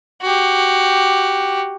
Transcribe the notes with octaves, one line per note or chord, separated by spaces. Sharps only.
F#4 G4